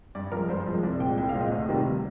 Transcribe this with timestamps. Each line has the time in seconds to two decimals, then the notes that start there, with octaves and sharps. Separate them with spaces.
0.15 G2 D5
0.32 F3 G#3 A#4
0.49 G2 C5
0.66 F3 G#3
0.83 C2 D5
1.00 A#2 G#3 C4 G5
1.17 C2 G5
1.29 F5
1.34 A#2 G#3 C4
1.41 D#5
1.52 D2
1.69 C3 D#3 G3 A#3